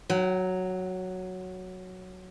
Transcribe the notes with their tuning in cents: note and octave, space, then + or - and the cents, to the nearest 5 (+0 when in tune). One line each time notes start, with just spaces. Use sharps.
F#3 +0 G5 -45